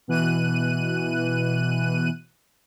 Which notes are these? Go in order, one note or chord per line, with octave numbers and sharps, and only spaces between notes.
B2 E3 F#6 D#7